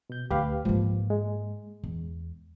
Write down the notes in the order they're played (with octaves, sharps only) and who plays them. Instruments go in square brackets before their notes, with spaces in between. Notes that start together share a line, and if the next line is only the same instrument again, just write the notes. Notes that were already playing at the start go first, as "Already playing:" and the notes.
[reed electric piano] B2 G6
[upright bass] D2 [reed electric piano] G4 B4 F5
[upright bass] G#2 A#3 [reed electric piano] F3
[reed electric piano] G#3
[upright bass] E2